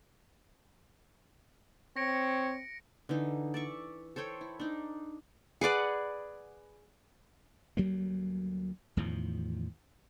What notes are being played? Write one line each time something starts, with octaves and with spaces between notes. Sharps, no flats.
C4 C#5 A#6 C#7 D7
D3 E3 D#4
D5 E5 C#6
A4 C5 C#5 G5
E4
D4 D#4
G#4 B4 D5 F#5
D2 F#3 G3 A#3
E2 A2 D#3 F3